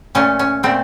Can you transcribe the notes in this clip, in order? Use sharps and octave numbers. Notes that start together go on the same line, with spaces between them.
A#2 A3 C#4
C#4
A#2 A3 C4